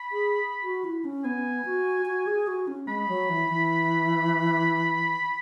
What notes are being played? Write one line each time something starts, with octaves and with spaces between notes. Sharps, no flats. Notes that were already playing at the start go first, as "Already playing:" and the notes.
Already playing: B5
G#4
F#4
E4
C#4
B3 G#5
F#4
F#4
G#4
F#4
C#4
G#3 B5
F#3
E3
E3